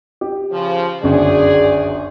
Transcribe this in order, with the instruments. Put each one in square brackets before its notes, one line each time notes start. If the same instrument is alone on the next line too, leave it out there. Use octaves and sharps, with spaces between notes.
[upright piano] G4
[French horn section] C#3 F3
[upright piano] G1 C#2 F#2 [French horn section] F#4 G#4 D5